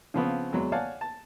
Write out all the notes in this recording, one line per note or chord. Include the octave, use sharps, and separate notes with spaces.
C#3 F3 B3 C4
E2 F#3 G#3
C#5 D5 F5 F#5 G#5 A5
A5